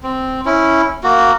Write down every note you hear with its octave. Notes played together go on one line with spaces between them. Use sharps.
C4
C#4 E4
A#3 F#4